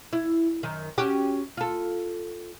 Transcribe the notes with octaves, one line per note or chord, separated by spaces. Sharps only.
E4
F#2 D#3
C#4 F#4 G4
F4 A4